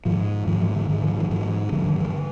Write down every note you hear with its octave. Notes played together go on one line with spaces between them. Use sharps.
G#2 D#3 F3
G#2 D#3 F3
E3 F#3
D3
G#2 D#3
D#3 F3
D#3 F3
G#2 E3 F#3
G2 D3 F3 G3
D#3 F3
D3 E3